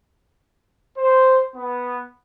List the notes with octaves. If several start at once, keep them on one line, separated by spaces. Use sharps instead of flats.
C5
B3